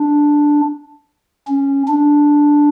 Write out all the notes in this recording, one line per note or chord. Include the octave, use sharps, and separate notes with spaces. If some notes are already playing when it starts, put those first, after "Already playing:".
Already playing: D4
C#4
D4